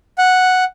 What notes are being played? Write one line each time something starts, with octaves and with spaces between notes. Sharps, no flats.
F#5